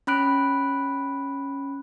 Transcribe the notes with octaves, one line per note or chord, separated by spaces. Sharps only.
C#4 B5 F#6 D7